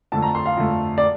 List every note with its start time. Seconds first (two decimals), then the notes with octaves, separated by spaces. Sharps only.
0.12 F2 D3 A3 A5
0.22 A#5
0.35 C6
0.46 F5
0.57 F2 D3 A3
0.98 D5